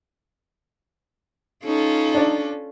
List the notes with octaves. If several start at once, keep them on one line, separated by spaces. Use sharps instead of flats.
C#4 D#4 F4 A4
D4 D5